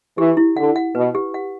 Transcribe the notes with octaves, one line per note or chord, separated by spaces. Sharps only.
E3 G4
E4
D3 F#5
F#5
B2 B4
G4
F#5